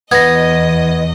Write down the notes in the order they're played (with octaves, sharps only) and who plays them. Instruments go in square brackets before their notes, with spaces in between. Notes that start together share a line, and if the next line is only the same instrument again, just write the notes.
[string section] E2 D#5 [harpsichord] B3 [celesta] G#6 A#6